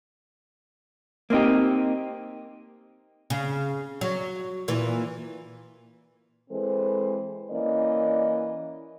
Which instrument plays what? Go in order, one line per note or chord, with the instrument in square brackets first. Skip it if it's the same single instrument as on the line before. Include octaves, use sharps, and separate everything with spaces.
[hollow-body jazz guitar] A#3 C4 D#4 G4
[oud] C#3
F#3
A#2 E3
[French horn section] E3 G#3 C4 A4 B4 C5
E3 A#3 C#4 D5 D#5